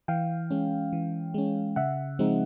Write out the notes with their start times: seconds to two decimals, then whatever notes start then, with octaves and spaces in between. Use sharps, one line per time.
0.08 E3 F5 G5
0.50 G#3 C#4
0.93 E3
1.34 G#3 C#4
1.76 C#3 E5 F#5
2.19 F3 G#3 C4 D#4